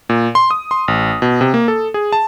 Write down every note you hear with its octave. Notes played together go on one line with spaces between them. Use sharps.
A#2
C6
D#6
C6
A1
B2
C3
A#3
A4
G#4
A5